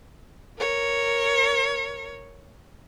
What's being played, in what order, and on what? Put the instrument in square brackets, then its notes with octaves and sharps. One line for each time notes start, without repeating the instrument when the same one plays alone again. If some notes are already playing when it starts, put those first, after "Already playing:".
[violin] A#4 C#5